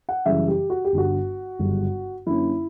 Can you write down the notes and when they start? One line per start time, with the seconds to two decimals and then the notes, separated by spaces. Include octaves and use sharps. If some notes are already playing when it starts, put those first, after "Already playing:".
0.09 F#5
0.26 F#2 C#3 E3 G3 E5
0.48 G4
0.70 F#4
0.85 G4
0.93 G1 G2 D3 F#4
1.59 G1 F#2 C#3 G3
2.26 F#2 D3 A#3 C#4 E4